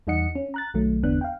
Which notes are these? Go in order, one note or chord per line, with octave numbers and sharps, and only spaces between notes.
E2 G3 D#4 D#5 F#5 C#7
C#4
A#5 F#6 A6
B1 D#3 F#3 A3
G1 E2 D3 B3 D4 F#6
F5 G5